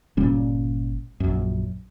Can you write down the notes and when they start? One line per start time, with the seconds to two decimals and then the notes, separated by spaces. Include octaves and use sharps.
0.17 G1 A#2 G3 C#4
1.20 A#1 F#2